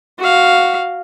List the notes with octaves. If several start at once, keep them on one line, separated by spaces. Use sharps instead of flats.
F#4 F5